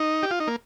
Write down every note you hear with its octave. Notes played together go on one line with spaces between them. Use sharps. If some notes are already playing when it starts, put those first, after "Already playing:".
Already playing: D#4
G4
F4
D#4
A#3